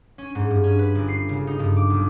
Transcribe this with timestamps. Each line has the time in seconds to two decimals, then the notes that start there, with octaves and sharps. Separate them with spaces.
0.18 C#4
0.35 G#2
0.50 G2
0.64 C#4
0.79 B4
0.95 G1
1.08 C7
1.29 C#3
1.47 D#4
1.59 G2
1.76 D6
1.90 B1